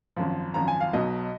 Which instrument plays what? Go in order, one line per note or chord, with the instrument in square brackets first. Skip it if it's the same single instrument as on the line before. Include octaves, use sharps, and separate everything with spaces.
[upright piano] G#1 F#2 F3
G#1 F#2 F3 A#5
G#5
F5
B1 B2 F#3 D#5